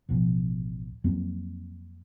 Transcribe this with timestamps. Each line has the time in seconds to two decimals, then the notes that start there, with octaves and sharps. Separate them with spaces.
0.09 A1 D2 B2 F3
1.04 F2 F#3 A#3 C4